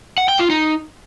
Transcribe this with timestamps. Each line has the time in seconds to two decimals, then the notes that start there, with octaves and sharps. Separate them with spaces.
0.18 F#5
0.28 G5
0.39 F4
0.50 D#4